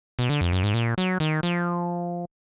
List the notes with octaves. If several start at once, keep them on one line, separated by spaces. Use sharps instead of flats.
B2
D3
F2
F#2
G#2
A#2
F#3
D#3
F3